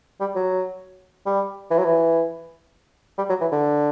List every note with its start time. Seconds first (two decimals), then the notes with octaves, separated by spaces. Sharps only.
0.20 G3
0.35 F#3
1.26 G3
1.71 E3
1.79 F#3
1.85 E3
3.18 G3
3.29 F#3
3.41 E3
3.52 D3